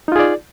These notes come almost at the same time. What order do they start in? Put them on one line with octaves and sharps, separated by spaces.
D#4 F4 G#4 D5